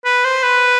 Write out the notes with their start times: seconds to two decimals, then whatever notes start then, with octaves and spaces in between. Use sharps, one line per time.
0.05 B4
0.25 C5
0.43 B4